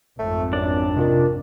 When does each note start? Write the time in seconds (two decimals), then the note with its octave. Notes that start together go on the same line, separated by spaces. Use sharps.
0.19 G#1 F2 A3
0.53 F#2 D4 D5
0.96 C3 D#3 F4 A#4